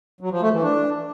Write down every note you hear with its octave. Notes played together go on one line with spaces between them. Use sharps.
F#3
F3
A3
E3
D4